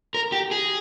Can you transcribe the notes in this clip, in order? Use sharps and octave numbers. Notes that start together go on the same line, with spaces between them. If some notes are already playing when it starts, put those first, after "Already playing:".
A#4
G4
G#4